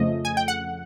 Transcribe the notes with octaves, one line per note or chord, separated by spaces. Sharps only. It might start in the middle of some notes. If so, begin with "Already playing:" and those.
Already playing: F2 C#3 F3 A3 D#5
G#5
G5
F#5